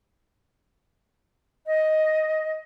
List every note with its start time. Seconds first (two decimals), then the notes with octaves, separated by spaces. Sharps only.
1.66 D#5